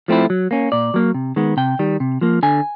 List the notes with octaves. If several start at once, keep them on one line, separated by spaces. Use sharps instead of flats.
F3 A3 C4 E4
F#3
A#3 C#4
A#2 D5
F#3 A#3
C3
D#3 G#3 B3
C3 G5
D#3 G3
C3
F3 A#3
D3 G#5